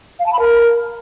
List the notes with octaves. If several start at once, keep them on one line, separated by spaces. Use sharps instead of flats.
F5
A5
B5
A#4